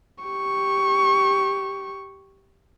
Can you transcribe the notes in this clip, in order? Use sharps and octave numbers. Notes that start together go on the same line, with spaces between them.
G4 C#6